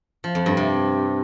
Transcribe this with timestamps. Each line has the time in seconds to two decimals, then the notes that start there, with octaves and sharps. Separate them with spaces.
0.24 F3
0.35 F2
0.46 G2
0.57 C3